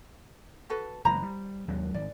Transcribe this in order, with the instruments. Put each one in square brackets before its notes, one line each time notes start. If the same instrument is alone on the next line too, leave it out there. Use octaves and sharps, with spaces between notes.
[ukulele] F#4 A4 B4
[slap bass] F#1 E3 G#3 [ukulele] C5 A#5 B5
[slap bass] G3
D#2 F#3 G#3
[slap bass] G#1 [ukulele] D5